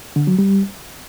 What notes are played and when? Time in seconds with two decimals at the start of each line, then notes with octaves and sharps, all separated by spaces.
0.16 D3
0.27 F#3
0.39 G3